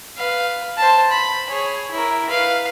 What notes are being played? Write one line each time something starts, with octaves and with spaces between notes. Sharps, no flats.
B4 F5
C5 A5
B5
G#4 C#5
E4 A#4
B4 F5